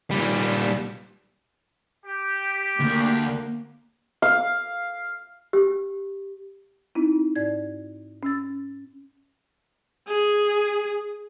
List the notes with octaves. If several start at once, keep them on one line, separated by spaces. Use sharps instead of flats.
A#2 G3
G4
D2 A#3
F5
G4
C4 D#4 E4
G#2 D5 G#6
C#4 E6 A6
G#4